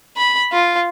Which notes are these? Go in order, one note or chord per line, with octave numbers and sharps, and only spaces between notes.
B5
F4